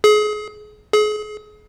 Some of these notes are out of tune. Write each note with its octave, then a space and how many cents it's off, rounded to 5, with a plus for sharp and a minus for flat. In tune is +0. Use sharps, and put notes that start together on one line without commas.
G#4 +30
G#4 +35